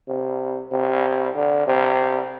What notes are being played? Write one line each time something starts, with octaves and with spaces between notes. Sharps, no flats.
C3
C3
D3
C3